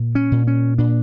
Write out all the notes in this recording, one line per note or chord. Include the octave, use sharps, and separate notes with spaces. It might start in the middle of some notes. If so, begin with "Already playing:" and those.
Already playing: A#2
C#4
A#2
C#4
A#2 D4